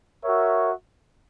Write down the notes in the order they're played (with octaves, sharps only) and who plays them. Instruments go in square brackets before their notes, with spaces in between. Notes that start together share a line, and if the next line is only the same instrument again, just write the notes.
[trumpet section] F#4 A#4 C#5 E5